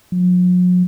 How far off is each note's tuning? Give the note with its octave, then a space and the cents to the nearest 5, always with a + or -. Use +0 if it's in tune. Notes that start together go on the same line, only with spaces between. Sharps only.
F#3 -45